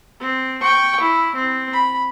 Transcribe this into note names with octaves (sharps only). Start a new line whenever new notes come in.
C4
G5 C#6
E4
C4
B5